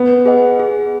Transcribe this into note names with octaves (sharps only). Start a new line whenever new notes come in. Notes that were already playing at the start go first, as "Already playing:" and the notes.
Already playing: B3
G#4 B4 D#5 F#5
G#4